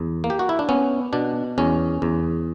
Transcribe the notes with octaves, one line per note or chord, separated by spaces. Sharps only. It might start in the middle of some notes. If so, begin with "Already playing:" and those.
Already playing: E2
A#3
G4
F#4
E4
D4
B3 C#4
B2 D4
E2 C#4
E2